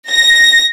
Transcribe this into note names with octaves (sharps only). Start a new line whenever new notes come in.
A#6